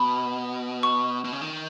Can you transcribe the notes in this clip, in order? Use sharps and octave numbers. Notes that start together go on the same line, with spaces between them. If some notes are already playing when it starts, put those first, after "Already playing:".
Already playing: B2 B5
C#6
B2
C#3
D#3